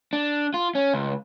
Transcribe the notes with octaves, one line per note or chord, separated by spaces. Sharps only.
D4
F4
C#4
C#2